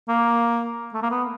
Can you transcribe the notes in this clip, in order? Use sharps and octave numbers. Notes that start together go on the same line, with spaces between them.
A#3
A3
A#3
B3